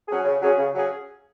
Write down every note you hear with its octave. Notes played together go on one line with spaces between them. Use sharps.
F#3 C#4 G#4
C#3
F#3 C#4 G#4
C#3
F#3 C#4 G#4